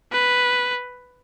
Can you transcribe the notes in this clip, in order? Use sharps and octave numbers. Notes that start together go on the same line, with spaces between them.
B4